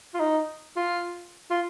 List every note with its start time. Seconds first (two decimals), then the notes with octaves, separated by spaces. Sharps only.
0.14 F4
0.20 D#4
0.76 F4
1.50 F4